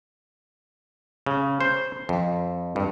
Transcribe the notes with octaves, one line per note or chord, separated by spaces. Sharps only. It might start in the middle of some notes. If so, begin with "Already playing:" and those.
C#3
C5
F2
G2